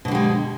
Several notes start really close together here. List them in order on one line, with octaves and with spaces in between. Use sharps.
B2 D3 G3 G#3